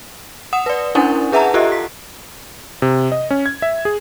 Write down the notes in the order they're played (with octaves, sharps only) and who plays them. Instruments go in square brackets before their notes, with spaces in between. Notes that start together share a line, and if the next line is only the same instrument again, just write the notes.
[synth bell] F#5 D#6 E7
B4 D5
C#4 D4 E4 A#4 F#5 G#5
G#4 B4 E5 F#5 A5 A#5
F4 G4 A4 D#5 E5
B6
[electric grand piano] C3
D#5
C#4
G#6
E5
G#4